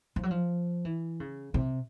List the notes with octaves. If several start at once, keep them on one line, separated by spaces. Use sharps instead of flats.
F3
F#3
F3
E3
C#3
C3